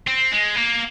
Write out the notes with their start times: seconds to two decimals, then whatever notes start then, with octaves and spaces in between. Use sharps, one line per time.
0.08 C4
0.32 G#3
0.55 A#3